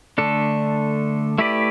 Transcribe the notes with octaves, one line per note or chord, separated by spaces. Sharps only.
D3 A3 D4 A4
A3 E4 G4 B4 D5